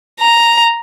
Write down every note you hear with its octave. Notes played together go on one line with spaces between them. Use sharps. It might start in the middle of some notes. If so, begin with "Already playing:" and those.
A#5